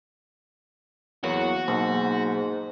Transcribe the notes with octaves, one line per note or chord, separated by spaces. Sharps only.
E2 F#3 A#3 F#4
B1 G#2 A#3